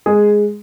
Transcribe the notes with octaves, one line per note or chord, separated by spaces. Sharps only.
G#3 G#4